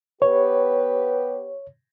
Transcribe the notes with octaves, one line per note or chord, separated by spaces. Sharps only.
B3 G4 B4 C#5